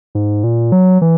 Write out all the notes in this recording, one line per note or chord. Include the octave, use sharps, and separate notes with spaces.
G#2
A#2
F#3
E3